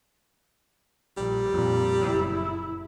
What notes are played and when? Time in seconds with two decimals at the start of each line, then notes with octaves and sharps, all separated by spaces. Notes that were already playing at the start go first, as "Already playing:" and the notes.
1.17 A#1 G3
1.50 F2 A#2
2.01 F#1 E4